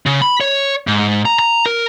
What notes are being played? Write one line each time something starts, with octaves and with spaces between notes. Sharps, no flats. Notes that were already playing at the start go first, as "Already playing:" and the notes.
C#3
B5
C#5
G#2
A#5
A#5
A#4